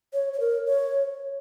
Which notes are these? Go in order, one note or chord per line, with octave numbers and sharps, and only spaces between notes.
C#5
C#5
A#4
C#5